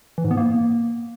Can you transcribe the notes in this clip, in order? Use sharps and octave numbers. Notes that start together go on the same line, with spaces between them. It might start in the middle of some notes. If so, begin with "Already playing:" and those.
E3
G#2
B3
A#3